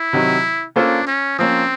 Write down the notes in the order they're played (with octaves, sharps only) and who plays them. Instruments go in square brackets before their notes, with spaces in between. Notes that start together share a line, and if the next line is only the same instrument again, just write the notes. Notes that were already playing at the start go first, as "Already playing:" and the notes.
Already playing: [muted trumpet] E4
[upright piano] C3 D#3 F#3
[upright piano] A#3 C#4 F4 A4 C5 [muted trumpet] D4
[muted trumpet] C#4
[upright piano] F3 A#3 C#4 [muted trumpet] C4